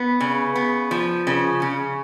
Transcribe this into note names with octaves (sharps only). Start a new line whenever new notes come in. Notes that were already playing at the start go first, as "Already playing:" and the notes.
Already playing: B3
C#3
B3
F3
C#3
C#3